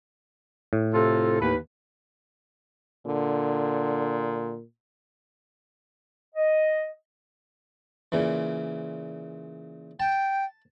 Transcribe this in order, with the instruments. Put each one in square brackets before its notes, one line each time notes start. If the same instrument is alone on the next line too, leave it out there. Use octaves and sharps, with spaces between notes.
[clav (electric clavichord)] A2
[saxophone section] C3 F4 A4
D#2 B4
[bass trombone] A#2 [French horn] D3
[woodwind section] D#5
[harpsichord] A#2 C#3 E3
[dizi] G5 [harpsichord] A5